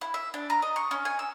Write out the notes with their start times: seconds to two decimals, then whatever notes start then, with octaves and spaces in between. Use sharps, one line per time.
0.01 E4
0.14 E5
0.34 D4
0.50 A#5
0.62 D#5
0.76 C#6
0.91 C#4
1.05 G#5
1.19 E6